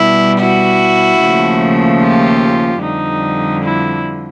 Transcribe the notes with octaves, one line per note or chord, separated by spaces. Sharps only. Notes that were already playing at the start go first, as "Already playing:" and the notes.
Already playing: B2 G3 E4
E4 F#4
D#2 C#3 F3 A3
F4 G4
F2 D3 G3 D#4
E4